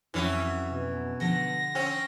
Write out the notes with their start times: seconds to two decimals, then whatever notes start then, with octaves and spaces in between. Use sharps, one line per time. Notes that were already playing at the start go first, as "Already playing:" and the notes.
0.14 F2 E3 F#3 C#4 F#4 E5
0.72 B2
1.20 D3 F3 F#5 A#6
1.75 C4 C#4